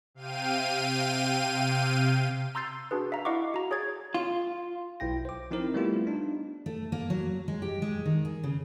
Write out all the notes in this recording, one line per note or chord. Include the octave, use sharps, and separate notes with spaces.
C3 F5 G5 D#7
A#5 C6 E6 G6 A6 C7
D4 F#4 G#4 B4
E5 F5 A#5
E4 D#5 F5 F#5 C#6 D6
F#4 A#5
G#4 C#5 D#6 G#6 A6
F4
B1 E4 G5 A#6
C5 D6
F3 C4 D#4 E4 A#4 C5
G3 A3 B3 E4 F4 G4
D4 D#4
A3
A#3
F#3
G#3
G4
G#3
D#3
G#4
C#3